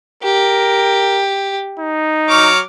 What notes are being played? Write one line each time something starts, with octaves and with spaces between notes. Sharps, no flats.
G4 A#4
D#4
F#3 C#5 D6 F6